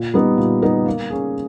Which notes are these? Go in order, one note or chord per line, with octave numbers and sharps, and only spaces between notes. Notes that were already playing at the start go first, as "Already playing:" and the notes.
Already playing: A#2
G3 B3 D#4
A#2
G3 B3 D#4
A#3
C#4 G#4